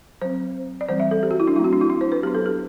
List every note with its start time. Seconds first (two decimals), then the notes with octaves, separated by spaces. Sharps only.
0.22 F#3 C4 C5
0.81 D5
0.89 E3 G3 C4 C5
1.00 E5
1.11 A4
1.23 G4
1.31 F#4
1.40 E4
1.48 D4
1.56 F#3 A3 C4 E4
1.64 F#4
1.73 D4
1.81 E4
1.90 D4
2.01 C5
2.12 B4
2.23 F#3 B3 D4 G4
2.35 A4
2.46 G4